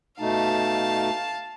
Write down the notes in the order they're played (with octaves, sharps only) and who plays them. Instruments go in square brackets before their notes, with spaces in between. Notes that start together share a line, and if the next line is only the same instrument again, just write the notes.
[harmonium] B2 A3 D#4 [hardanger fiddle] F5 A5